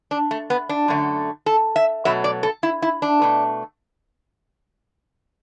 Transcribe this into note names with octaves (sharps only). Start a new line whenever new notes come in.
D4
A3
B3
D4
F#2 D3 A3
A4
E5
B2 F#3 A3 E5
D5
A4
E4
E4
D4
B2 A3